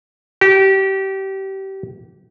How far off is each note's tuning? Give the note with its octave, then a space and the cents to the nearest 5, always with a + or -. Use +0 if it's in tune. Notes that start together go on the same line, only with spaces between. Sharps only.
G4 -25